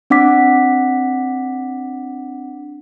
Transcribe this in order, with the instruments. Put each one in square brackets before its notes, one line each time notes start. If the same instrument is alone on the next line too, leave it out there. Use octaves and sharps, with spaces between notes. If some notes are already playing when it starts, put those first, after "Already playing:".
[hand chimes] C4 D4 F#5 D6 B6